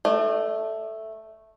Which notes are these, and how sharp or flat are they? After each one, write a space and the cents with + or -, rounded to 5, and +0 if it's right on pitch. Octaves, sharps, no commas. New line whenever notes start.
A3 +0 D5 +45